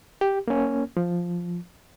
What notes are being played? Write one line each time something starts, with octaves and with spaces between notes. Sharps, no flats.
G4
A#3 C#4
F3